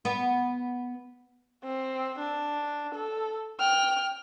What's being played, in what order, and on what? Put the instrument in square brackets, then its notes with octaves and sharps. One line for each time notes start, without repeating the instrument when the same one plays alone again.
[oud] B3
[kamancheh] C4
D4
A4
G5 F6